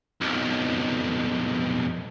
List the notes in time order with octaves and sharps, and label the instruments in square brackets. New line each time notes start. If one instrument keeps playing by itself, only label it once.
[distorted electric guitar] B1 F2